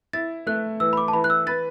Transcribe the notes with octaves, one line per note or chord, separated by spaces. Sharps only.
E4 A6
A3 F#6
E3 E6
B5
D6
A5
E3 B5
F#6
E6
B4 A6